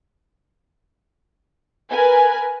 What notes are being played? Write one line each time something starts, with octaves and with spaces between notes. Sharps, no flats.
A#4 B4 G#5